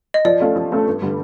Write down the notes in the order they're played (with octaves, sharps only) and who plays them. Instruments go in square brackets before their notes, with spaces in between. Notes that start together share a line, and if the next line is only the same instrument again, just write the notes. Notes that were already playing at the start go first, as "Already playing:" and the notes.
[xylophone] D#5
[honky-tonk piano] F3 [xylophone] D5
[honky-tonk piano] A3 C#4 F4 A4
F3
A3 C#4 F4 A4
G2
D3 G3